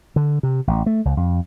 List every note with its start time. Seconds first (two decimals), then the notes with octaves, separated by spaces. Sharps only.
0.16 D3
0.43 C3
0.67 A1
0.86 A3
1.05 C#2
1.17 F2